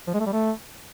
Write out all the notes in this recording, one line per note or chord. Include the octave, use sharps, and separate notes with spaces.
F3
G#3
A3
G3
A3